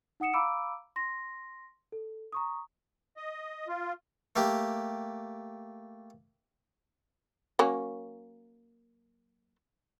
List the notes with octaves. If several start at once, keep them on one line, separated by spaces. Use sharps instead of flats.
D#4 F#5 D#6 C#7 E7
F5 A#5 B5 D6 E6 D7
C6 A#6
A4
A#5 C#6 D#6
D#5
F4
A3 A#3 G4
F#3 A#3 C#4